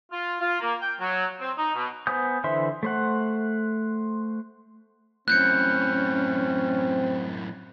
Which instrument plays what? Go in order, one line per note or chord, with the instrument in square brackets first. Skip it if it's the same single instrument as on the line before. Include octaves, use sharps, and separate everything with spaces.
[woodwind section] F4
F4
A#3
G5
F#3
C4
D#4
B2
[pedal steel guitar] B3 C5 G#5 D#6 G6
D3 E3 C5 E5 C6
A3 C5 F#5
[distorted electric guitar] F#2 A2 [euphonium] C4 [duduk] C#4 [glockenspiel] F#6 G6 C#7